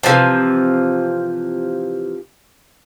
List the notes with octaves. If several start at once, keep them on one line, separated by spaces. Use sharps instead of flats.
C3 E3 F3